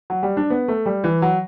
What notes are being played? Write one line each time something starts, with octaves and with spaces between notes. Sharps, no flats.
F#3
G3
D4
B3
A3
G3
E3
F#3